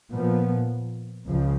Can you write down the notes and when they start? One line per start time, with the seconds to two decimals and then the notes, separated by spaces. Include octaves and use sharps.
0.13 A#2 F3 B3
1.27 C#2 C#3 F3